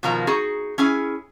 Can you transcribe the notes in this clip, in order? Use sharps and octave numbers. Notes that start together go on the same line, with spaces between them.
B2 D#3 F3 A#3 A#5
D#4 F#4 G#4
C#4 E4 G#4 G#5